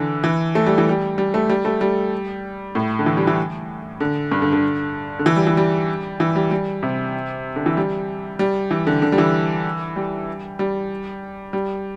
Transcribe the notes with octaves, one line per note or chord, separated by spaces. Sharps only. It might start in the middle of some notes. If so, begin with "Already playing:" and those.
Already playing: D3 E3
E3
A3
G3
E3
G3
G3
A3
G3
A3
G3
A2
D3
E3
G3
E3
D3
G2
D3
D3
D3
E3
G3
E3
G3
E3
G3
G3
C3
D3
E3
G3
G3
E3
D3
D3
G3
E3
G3
G3
G3